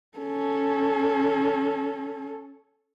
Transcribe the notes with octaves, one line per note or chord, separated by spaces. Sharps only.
C#4 A4